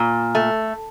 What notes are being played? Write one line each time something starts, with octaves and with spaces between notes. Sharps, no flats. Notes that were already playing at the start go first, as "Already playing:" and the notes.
Already playing: A#2
A3